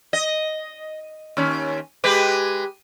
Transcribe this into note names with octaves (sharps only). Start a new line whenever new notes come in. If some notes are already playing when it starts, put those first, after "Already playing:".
D#5
D#2 C#4
G#3 G4 B4